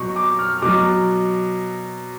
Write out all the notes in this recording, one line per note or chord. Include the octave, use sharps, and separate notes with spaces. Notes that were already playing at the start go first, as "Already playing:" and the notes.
Already playing: B2 F#3 C#6
D6
F6
F6
B2 F#3 D6